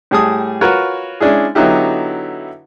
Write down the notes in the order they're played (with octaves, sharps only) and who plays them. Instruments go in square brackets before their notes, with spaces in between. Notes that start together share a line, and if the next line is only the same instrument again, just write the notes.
[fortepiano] A2 G3 G#4 A5 D#6
F4 F#4 A#4 B4 C#5
G#3 C#4 D4 E4 G#4
D3 F#3 B3 D#4 E4 G4